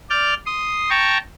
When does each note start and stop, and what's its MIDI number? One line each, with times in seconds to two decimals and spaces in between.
0.10 0.34 74
0.10 0.34 89
0.10 0.34 91
0.46 0.90 84
0.46 0.90 87
0.90 1.18 79
0.90 1.18 81
0.90 1.18 82
0.90 1.18 85